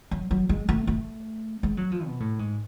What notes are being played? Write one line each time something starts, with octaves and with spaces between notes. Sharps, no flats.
F#3
F#3
G#3
A3
A3
G#3
F#3
F3
B2
A2
G#2